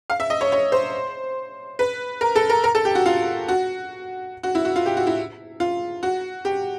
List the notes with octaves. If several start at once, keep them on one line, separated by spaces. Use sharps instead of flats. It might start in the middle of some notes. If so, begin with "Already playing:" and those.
F5
E5
D#5
C#5
C#5
C5
B4
A#4
A4
A#4
A#4
A4
G4
F#4
F4
F#4
F#4
E4
F#4
F4
G4
F#4
E4
F4
F#4
G4